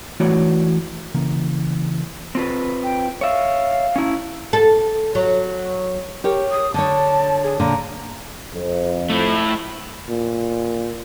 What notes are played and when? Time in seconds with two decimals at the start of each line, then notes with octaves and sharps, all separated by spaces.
0.20 E3 A3 F#4 C#5 D5
1.15 C#3 E3 A#3
2.35 C4 F4 B4
2.83 G5
3.21 C#5 E5 F5
3.96 C#4 E4
4.53 A4
5.15 F#3
6.24 G4 A#4 C#5
6.51 D#6
6.74 D3 C#5 A5
7.44 G#4
7.60 A#2 D3 A#5
8.55 F2
9.10 A3 E4
10.09 A#2